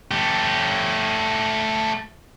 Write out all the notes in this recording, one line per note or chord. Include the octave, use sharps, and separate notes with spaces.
A3 G4